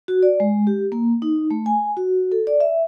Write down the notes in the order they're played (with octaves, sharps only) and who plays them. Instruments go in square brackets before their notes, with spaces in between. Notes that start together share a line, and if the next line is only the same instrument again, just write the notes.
[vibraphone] F#4
D5
G#3
G4
A#3
D#4
A3
G#5
F#4
A4
D5
E5